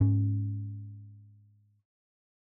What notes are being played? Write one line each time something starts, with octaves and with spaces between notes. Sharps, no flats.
G#2 C#4